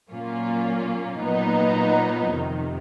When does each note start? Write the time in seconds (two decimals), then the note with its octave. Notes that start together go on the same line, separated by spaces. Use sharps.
0.11 A#2 F#3 A#3 C#4 F4
1.22 A#2 F#3 B3 D#4
2.33 F2 C3 D#3